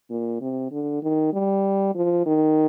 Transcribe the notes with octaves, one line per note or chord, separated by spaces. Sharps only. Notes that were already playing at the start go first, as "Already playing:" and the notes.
A#2
C3
D3
D#3
G3
F3
D#3